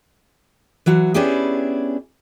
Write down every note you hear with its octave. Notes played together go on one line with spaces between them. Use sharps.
E3 F#3 F#4
B3 C#4 D4 E4 G4 G#4